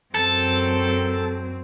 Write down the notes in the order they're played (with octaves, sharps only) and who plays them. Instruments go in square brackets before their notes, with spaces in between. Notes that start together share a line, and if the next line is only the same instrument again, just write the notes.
[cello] F#2 C4 [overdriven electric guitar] A4